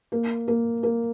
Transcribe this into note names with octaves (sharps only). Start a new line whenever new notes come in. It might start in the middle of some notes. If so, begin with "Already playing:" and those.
A#3
A#3
A#3